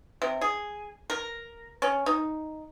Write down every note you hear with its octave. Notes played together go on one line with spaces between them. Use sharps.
C3
G#4
A#4
C#4
D#4